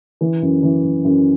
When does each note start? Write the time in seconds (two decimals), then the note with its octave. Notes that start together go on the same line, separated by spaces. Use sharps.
0.21 E3
0.42 F#2
0.63 E3
0.84 F#2
1.05 F#2